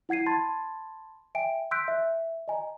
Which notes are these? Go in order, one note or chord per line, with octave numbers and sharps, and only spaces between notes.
E4 F#5 G#6 C7 D#7
A5 B5 C6 G#6 A6
E5 G5 G#5 D7
C6 E6 F#6 G6 B6 D7
E5
D#5 G#5 A#5